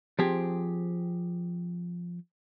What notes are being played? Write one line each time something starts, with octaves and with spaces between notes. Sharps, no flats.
F3 C4 G4 G#4